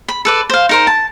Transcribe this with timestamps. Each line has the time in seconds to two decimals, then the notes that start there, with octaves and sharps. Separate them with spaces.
0.08 B5
0.25 A4 B4 D5
0.50 C5 F5
0.69 D#4 A#4 C5
0.87 A5